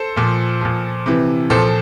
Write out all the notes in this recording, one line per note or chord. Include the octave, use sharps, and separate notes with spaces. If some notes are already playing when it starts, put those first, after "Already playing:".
Already playing: A4 C5
A#2 F3
A#2 F3
C3 E3
A#2 F3 A4 C5